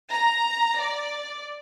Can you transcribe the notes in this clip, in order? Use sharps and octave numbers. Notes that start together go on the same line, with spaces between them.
A#5
D5